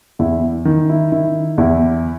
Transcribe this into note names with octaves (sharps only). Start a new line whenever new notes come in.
E2 E4
D#3
E4
D#3 E4
E2 E4